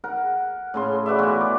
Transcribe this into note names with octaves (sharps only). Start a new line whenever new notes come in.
A#4 F#5
A2 C#3 C6
F#4 B4 D5 E5
B2 E3 F4 F#4
D6